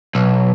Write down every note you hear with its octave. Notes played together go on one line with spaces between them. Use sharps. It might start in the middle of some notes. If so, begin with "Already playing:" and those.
B1